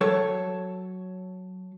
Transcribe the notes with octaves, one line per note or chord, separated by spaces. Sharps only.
F#3 A4 C#5